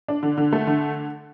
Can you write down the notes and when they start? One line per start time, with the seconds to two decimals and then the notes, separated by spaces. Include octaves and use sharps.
0.08 D4
0.23 D3
0.38 D3
0.53 A3
0.67 D3